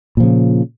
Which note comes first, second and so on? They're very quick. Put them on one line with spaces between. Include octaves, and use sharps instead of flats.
A#2 F3 C#3